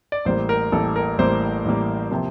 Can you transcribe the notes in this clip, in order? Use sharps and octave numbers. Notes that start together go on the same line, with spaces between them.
D5
A1 A2 G3 A#3 C5
A#4
A1 A2 G3 A#3 A4
A#4
A1 A2 G3 A#3 C5
A1 A2 G3 A#3
C3 F3 A#3